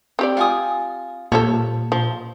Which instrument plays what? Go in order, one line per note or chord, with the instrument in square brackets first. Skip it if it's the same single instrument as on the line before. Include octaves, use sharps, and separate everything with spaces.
[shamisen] C4 G4 D5
[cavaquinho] F4 G#5 D#6
[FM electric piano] A#2 [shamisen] F3 G3 A4 [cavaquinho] C#5
[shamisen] F3